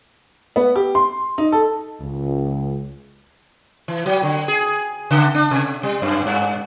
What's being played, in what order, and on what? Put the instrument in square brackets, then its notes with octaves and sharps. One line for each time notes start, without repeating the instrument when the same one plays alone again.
[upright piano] B3
G4
C6
D#4
A4
[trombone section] C#2
[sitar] E3
F#3
D3
G#4
C#3
D4
C3
G3
F#2
G2